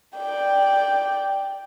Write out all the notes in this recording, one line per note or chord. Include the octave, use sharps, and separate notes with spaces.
D5 G5